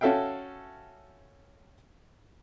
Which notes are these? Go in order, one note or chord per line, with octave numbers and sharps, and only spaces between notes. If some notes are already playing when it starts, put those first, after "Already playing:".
C#4 F#4 A4 E5 F5 G5